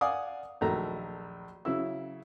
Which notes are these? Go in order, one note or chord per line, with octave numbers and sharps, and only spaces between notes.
D5 F5 F#5 G#5 D6 D#6
A#1 D#2 F#3 A3 A#5
C#3 F#3 E4 E6